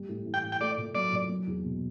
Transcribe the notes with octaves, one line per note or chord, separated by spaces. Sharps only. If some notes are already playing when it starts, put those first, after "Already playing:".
Already playing: G3
A2
E3
G5
A2
G5
A3 D5
A#2
F#3 D5
A#2
F#3
E2
B2